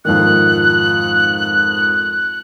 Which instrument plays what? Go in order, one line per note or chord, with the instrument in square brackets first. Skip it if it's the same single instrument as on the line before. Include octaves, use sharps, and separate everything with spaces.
[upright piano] F2 G#2 D#3 [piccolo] F#6